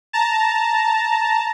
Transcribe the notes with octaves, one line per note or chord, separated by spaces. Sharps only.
A5 A#5